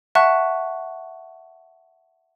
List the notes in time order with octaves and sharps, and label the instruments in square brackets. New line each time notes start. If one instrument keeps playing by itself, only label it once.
[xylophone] E5 F#5 A5 C#6 F#6